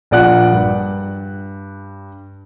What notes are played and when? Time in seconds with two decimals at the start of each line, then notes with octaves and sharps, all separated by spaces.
0.11 A#1 A#2 D5 F#5 F#6
0.52 G2